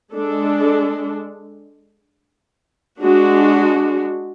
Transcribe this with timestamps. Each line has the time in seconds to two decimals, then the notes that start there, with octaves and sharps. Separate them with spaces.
0.13 G#3 D4 A4
2.99 G#3 D4 F#4